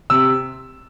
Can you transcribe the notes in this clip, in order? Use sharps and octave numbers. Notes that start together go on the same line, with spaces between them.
C3 E6